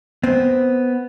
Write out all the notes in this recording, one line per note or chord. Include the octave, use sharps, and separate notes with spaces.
B3 C4